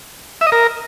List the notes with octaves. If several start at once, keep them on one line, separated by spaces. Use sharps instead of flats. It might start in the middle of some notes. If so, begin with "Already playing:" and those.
E5
D#5
A#4